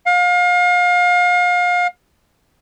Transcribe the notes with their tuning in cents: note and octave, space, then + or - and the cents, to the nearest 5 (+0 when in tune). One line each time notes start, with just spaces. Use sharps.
F5 +35